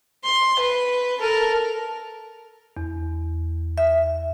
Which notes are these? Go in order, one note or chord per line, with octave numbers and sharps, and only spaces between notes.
C6
B4
A4 A#4
E2
E5